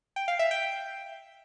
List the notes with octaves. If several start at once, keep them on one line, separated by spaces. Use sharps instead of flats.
G5
F5
E5
G5